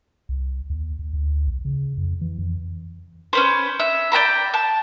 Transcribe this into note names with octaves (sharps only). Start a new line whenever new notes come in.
C2
D#2
D#2
D2
B1
C#3
F2
E3
F2
C#4 B4 C5
E5
D5 G5 A#5 B5
A5